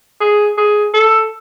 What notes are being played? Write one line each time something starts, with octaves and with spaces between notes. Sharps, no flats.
G#4
G#4
A4